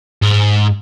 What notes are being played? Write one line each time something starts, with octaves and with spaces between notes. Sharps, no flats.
G#2